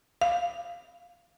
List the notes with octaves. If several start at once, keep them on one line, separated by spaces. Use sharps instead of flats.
F5